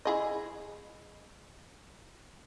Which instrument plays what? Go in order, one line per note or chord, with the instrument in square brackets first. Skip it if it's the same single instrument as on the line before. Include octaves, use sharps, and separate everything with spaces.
[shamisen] E4 G#4 D#5